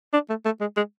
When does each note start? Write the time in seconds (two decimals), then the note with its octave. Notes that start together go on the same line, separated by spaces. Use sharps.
0.13 D4
0.30 A3
0.45 A3
0.61 G#3
0.77 G#3